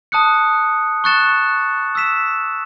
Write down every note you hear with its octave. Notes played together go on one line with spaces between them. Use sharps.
A5 D#6 F#6 C#7
C#6 F#6 A6 C#7 E7
E6 B6 E7